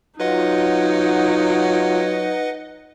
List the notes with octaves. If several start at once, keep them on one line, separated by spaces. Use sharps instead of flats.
F#3 D#4 F4 B4 D#5 F#5